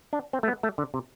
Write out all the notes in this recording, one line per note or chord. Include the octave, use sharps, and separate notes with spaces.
D4
C4
A3
B3
A3
D3
C3